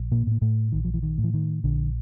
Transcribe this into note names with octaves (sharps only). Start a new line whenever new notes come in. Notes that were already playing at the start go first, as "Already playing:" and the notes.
Already playing: A#1
A#2 A#3
A2 A#3
A2 A3
A#1 D#3
F3
E3
D#3
A2
E3
D#3
A#1 D3